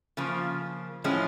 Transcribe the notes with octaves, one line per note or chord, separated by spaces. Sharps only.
C#3 F3 A#3
A2 F3 G#3 C#4